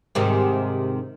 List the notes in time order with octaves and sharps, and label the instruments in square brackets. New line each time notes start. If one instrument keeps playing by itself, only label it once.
[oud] G#2 C3 D#3